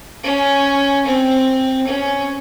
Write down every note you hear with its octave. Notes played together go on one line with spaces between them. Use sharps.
C#4
C4
C#4